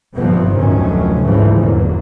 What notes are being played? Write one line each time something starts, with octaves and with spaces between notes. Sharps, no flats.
G1 G2 C3 F3 B3 C4
F1 D2 A2 D#3 F#3 C#4
D2 G#2 C#3 E3 F3 A3
G1 E2 G#2 D3 F#3 A#3